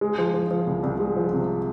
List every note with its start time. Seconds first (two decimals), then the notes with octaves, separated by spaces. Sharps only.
0.01 G#3
0.18 F3
0.34 F3
0.51 F3
0.67 C2
0.83 C2
0.99 G#3
1.16 F3
1.33 C3